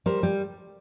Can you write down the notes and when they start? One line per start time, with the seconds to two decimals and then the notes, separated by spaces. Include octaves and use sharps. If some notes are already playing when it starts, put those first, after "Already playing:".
0.06 G3 A#4 C5
0.23 G3